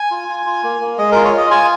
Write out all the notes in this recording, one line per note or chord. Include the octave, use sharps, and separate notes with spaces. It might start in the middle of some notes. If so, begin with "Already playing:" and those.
Already playing: G#5
F4
F4
F4
A#3
A#3
G#3 D#5
F4 A#4
C#5
F4 D#5
F4 G#5